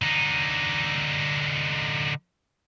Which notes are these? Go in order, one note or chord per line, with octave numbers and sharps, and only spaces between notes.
D3 D#4